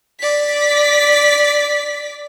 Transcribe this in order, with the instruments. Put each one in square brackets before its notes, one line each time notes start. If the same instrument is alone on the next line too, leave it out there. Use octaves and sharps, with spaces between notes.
[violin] D5 B6